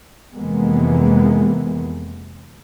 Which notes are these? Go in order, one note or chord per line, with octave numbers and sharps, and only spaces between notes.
F2 C3 E3 G#3 A#3 B3